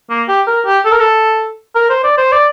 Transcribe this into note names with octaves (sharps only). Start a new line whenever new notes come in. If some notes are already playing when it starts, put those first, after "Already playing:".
A#3
G4
A#4
G4
A4
A#4
A4
A#4
C5
D5
C5
D5